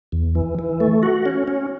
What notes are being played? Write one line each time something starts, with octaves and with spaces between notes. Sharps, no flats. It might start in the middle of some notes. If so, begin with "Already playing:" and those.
E2
E3
E3
A3
F#4
C#4
C#4